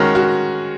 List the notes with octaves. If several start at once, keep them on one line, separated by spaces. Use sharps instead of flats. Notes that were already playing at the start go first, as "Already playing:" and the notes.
Already playing: D#3 G#3 C#4 F#4 A#4
F#4